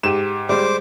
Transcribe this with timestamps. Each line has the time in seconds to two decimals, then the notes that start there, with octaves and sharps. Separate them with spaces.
0.03 G#2 G4 D#7 E7
0.49 G3 G#3 C5 D6